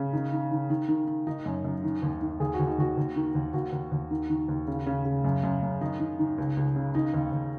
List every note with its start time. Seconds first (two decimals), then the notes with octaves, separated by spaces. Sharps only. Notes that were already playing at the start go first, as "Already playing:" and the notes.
Already playing: C#3
0.13 D#3 D#4
0.32 D#3
0.51 D#3
0.70 D#3
0.88 D#3
1.07 D#3
1.27 D#3 D#4
1.46 F#2
1.64 F#2
1.83 D#3
2.02 D#2
2.21 D#3
2.40 D#2 G#4
2.54 F#4
2.59 D#2
2.67 D#4
2.78 D#2 F#4
2.97 D#2
3.16 D#3
3.35 D#2
3.54 D#2 F#4
3.72 D#2
3.92 D#2
4.11 D#3
4.30 D#3
4.48 D#2
4.67 C#3
4.86 C#3
5.05 C#3
5.24 F#2
5.43 F#2
5.62 F#2
5.81 D#3 D#4
6.00 D#3
6.19 D#3
6.38 C#2
6.57 C#2
6.76 C#3
6.95 D#3 D#4
7.14 D#2
7.32 D#2